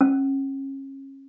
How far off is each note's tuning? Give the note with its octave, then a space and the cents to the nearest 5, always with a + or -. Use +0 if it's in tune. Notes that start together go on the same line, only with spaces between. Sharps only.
C#4 -30